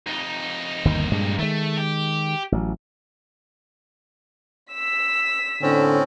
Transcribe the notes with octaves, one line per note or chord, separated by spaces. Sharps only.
F2 D#4
G1 D#2 D#3
G2 A#2 G#3
D#3 G#3 A3
G4
A1 F#3
E6 B6
A2 D3 C4 C#4